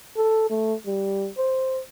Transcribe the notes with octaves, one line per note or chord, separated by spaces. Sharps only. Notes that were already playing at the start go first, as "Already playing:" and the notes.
A4
A3
G3
C5